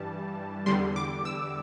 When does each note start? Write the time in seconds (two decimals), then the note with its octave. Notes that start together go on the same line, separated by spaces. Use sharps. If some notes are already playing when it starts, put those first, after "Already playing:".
Already playing: G2 E3 G3 A5
0.66 E2 D3 G3 C6
0.96 D6
1.25 E6